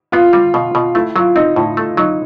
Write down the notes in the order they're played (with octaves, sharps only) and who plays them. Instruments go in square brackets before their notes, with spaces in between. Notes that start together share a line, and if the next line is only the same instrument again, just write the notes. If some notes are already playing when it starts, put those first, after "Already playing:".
[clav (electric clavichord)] B3 [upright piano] F4
[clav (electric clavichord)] G3
B2
B2
[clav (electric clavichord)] A3 [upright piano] E4
[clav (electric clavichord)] F#3 [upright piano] F4
[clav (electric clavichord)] C4 [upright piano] D#4
[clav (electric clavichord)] A2 [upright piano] E4
[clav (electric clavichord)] A3
[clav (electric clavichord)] F#3 [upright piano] D#4